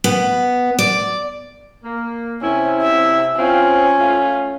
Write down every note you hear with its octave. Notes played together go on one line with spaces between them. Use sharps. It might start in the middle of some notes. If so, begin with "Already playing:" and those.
B3
D5
A#3
C3 C#4 E4
E5
C4 C#4 F4
A3 F4